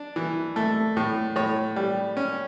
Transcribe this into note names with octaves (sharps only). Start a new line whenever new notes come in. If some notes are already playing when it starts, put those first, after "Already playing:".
Already playing: D4
E3
A3
A2
A2 C#5
G3
C#4